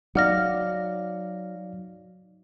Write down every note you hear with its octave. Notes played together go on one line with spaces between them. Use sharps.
F#3 D#4 D5 F5 F#5 F6 A#6